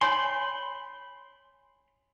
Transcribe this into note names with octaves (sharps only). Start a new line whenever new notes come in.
C#5 G#5 B5 C6